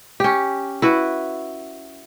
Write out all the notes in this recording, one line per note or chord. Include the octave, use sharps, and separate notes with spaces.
C#4 G4
E4 F#4 B4